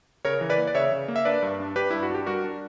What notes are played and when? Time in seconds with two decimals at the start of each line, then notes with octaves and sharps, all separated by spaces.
0.25 C#3 A#4 C#5
0.41 E3
0.50 B4 D5
0.58 A#3
0.67 D5
0.75 C#3 C#5 E5
0.92 C#3
1.08 A#3
1.16 E5
1.25 D4 B4 D5
1.42 G2
1.60 D4
1.76 D4 G4 B4
1.90 G2 E4
2.03 F#4
2.10 D4 G4
2.26 G3 F#4 A#4
2.44 D4